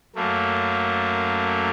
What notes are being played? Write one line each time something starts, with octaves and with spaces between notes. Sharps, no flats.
F#2 A3 A#3